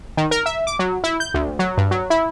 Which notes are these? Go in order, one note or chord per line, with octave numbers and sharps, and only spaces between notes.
D#3
A#4
E5
D6
F#3
E4
G6
D2
F#3
G2
F#3
E4